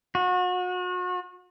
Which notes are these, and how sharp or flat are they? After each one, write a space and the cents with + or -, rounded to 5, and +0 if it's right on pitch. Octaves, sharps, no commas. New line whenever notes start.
F#4 -35